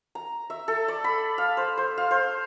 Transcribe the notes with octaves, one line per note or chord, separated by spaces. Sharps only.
A#5
E5
A4
D5
B5
F5
C5
C5
F5
C5